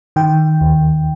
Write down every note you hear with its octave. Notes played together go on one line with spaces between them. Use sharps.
D#3 G5
D#2